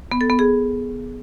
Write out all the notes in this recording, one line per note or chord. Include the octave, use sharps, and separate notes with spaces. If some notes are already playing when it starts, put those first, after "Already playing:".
B3
A4
B3
G#4